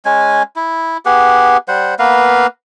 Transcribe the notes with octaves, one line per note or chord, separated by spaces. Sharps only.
G#3 C#4 G#5
E4
B3 G4 G#4 F#5
G3 C5 F#5
A#3 B3 B4 F5